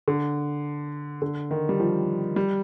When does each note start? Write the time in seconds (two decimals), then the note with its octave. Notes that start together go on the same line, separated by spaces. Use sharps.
0.08 D3
1.22 D3
1.51 D#3
1.69 G3
1.80 F3
2.36 G3